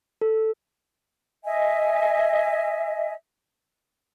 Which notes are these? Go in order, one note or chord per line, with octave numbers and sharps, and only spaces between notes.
A4
D#5 E5 G#5